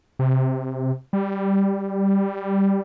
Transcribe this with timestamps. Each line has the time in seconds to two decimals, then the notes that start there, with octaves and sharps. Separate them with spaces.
0.19 C3
1.13 G3